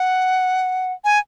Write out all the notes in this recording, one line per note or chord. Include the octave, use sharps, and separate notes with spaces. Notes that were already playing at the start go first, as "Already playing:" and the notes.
Already playing: F#5
G#5